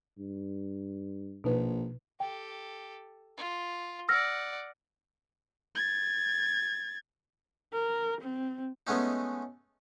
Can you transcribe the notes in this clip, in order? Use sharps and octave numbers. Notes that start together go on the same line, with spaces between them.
G2
A#1 B2 D#4 B4
G4 A4 G5
F4
D5 F#5 E6 F6 A#6
G#6 A6
A#4
C4
G#3 A3 B3 C#4 D#4